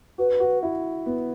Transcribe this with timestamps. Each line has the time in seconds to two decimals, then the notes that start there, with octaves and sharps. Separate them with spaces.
0.18 F#4 B4
0.40 F#4
0.63 E4
1.06 B3